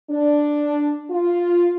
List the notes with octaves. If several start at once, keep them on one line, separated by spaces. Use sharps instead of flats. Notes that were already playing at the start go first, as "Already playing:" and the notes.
D4
F4